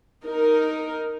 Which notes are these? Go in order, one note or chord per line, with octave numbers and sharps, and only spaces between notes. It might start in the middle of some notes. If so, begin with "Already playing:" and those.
D#4 A#4